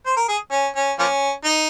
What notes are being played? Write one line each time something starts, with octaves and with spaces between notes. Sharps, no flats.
C5
A#4
G#4
C#4
C#4
F3 A#3 C#4
D#4